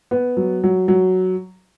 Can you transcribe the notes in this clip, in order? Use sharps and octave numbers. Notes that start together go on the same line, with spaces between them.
B3
F#3
F#3
F#3